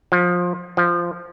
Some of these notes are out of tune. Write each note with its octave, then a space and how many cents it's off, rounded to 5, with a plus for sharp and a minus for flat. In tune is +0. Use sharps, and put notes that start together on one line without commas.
F3 +20
F3 -10